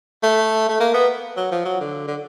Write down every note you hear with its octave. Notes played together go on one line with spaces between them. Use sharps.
A3
A3
A#3
B3
F#3
F3
F#3
D3
D3